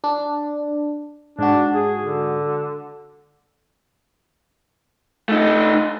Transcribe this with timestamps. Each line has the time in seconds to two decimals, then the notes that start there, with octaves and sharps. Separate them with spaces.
0.04 D4
1.39 G#2 D4 F#4
1.74 G#4
2.03 D3
5.29 A3 D#4